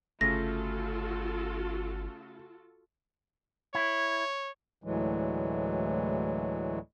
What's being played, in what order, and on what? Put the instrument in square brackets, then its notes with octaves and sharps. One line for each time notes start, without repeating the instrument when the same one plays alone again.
[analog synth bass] G1 [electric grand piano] C#3 A3 [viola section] F4 F#4 A4 [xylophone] A#6
[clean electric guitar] E4 [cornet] C#5
[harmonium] D2 A2 E3 F#3 G#3